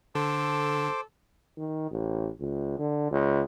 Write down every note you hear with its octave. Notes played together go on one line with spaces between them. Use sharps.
D3 A4 C5 D6
D#3
A1
C#2
D3
C#2